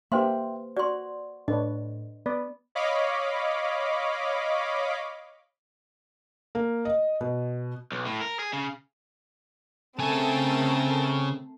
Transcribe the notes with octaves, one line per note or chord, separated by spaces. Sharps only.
A#3 G4 B4 C5 E5 G5 C6
F#4 D5 C6
A2 D4 B4 C#5 D#5
B3 D5
C#5 D#5 F5 B5 D6
A#3
D#5
B2
B1
A2
A#4
G#4
C#3
C#3 A3 C4 A4 A#4 G#5